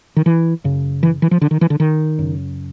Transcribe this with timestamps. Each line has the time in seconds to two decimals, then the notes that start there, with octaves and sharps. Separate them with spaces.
0.16 D#3
0.26 E3
0.64 F#2 C#3
1.03 E3
1.22 E3
1.31 F3
1.41 D3
1.51 D#3
1.61 E3
1.70 D3
1.80 D#3
2.19 F#2 C#3